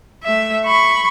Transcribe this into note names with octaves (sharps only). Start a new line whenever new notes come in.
A3 E5
B5 C#6